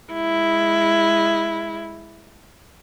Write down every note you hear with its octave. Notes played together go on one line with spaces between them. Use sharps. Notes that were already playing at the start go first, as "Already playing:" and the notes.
G#3 E4